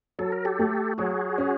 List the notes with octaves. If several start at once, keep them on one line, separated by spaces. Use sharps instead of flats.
F#3 A4
A#4
G4 A4
A3
F#3 F#4 G#4
C#4